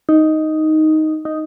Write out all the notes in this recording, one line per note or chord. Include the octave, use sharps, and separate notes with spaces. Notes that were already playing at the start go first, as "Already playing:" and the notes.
D#4
D#4